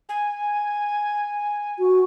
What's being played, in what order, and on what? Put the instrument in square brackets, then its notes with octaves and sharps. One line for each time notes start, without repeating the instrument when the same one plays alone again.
[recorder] G#5
[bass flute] F#4